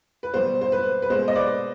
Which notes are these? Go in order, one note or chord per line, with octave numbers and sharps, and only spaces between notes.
B4
B2 G3 C5
C5
B4
B4
B2 G#3 C5
D#5
B4 D5